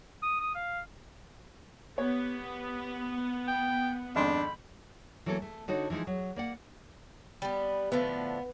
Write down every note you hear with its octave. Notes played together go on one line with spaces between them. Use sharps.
D#6
D#6
F5
B3 G4 C#5
G5
G#1 F2 D4 B5
E3 F#3 A#3 B3 A4
A3
D3 D#4 F#4 C#5
E3 F3 G#3 D#4
F#3
A#3 D5 F#5
G3 B3
A2 D3 F3 B3